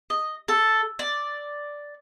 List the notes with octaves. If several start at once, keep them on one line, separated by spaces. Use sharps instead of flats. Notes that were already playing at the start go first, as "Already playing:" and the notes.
D#5
A4
D5